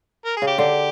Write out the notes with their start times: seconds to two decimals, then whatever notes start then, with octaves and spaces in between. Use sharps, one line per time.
0.25 A#4
0.37 G#4
0.42 C#3
0.47 G4
0.58 D3 G4